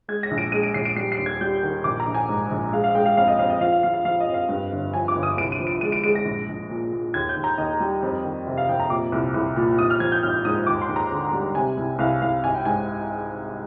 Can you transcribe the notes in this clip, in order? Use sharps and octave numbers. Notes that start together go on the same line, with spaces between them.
G#3 G#6
A#6
A#1
D7
G#3 D#7
D7
A#1 C7
D7
G3 C7
C7
D#2
G#6
G3 G6
D#3
A#1 D6
A#5
A#1
G#5
G#2
A#1
G#3 F5
F5
G#3 G5
F5
F2 F5
D#5
F2 F5
D#5
F3 F5
F5
F3 F5
F5
F3 F5
D#5
F2
F5
G2
G1
F3 G#5
D6
G1
D#6
C2 D7
D#7
F3
D7
G#3 D#7
D7
G#3 D7
A#6
A#1
A#1
A#2
A#2
D#2 G#6
G6
D#2
A#5
D#2 D#5
G3
F2
D#3
C3
F5
F2 G5
A#5
A#2 D6
C2
C2
A#2
G#1 D#6
F6
F3 G#6
G6
G#1 F6
G#2 D#6
D#2 D6
C6
D#2
A#5
D3
G3
C3 G#5
C2
C2 F5
C2 F5
G#1 G#5
G5
G#2 G#5